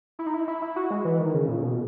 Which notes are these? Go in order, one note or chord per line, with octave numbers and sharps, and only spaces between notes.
E4
D#4
E4
E4
E4
F#4
G#3
E3
D#3
C#3
A#2
B2